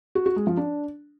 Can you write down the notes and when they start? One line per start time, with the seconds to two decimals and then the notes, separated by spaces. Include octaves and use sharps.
0.15 F#4
0.26 F#4
0.36 G#3
0.47 F3
0.57 D4